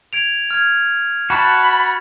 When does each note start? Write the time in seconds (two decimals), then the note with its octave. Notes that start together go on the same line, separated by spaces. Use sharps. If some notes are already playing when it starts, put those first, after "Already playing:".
0.13 G#6 D7 F7
0.51 F6 G#6
1.30 F#4 A5 B5